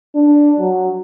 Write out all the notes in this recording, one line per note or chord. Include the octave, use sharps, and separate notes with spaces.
D4
F#3